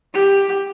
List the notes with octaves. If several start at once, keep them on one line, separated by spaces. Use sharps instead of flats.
G4